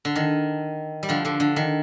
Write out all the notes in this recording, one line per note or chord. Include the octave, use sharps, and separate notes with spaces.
D3
D#3
G3
D3 F3
D3 F3
D3
D#3